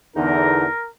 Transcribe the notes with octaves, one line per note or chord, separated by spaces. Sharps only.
E2 D3 D#4 A#4